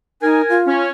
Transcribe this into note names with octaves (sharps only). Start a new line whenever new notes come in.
D#4 A#4 G#5
F4
C#4